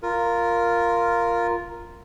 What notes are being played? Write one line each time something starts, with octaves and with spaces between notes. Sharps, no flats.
F4 A#4